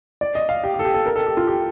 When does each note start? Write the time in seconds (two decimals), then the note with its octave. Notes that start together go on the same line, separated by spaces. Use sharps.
0.21 D5
0.35 D#5
0.49 F5
0.64 G4
0.74 G4
0.79 A4
0.85 G4
0.94 A4
1.06 A#4
1.16 A4
1.26 G4
1.37 F4
1.47 G4